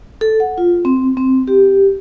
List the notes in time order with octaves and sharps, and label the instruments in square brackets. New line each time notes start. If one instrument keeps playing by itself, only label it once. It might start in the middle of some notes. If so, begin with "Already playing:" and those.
[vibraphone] A4
F#5
F4
C4
C4
G4